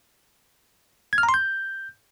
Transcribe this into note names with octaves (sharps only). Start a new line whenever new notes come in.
G#6
F6
A#5
C6
G6